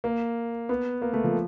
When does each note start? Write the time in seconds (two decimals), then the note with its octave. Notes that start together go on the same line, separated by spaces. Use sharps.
0.04 A#3
0.69 B3
1.02 A#3
1.13 A3
1.24 F3